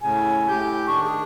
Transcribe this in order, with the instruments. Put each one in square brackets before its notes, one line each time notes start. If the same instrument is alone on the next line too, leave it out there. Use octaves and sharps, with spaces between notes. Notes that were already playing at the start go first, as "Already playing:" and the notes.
[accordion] A2 C#3 [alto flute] G#5
[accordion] A2 G4 G6
[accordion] D#3 D4 [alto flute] C#6
[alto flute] G#4